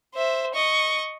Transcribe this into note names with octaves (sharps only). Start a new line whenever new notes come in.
C5 E5
D#5 C#6